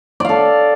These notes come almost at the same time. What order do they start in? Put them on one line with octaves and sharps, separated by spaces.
D5 F5 A4